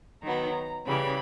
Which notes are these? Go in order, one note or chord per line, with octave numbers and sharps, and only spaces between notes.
D#3 F#3 B3 A#5
C#3 E3 G3 B5